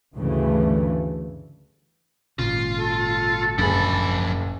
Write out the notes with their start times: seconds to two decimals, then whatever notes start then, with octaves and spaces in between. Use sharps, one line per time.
0.15 D2 G2 C#3 E3 A3
2.39 G#1 A#2 C#3 F4
2.78 A4
3.58 F#1 D2 F3 G#4 B5